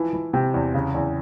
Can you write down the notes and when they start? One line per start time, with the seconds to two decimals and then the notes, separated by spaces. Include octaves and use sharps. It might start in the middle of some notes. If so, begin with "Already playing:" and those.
Already playing: E3 F3
0.13 E3
0.33 C3 G5
0.54 E2
0.74 C#3
0.94 E2